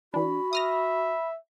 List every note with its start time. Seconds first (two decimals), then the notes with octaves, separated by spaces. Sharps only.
0.14 E3 D4 F#4 B5
0.53 E5 D#6 F6 A#6